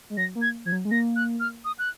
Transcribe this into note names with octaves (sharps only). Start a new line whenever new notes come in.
G#3
F#3 A#6
A#3
G#6
F3 G#6
F#3
G#3
A#3 A#6
F#6
F6
D#6
F#6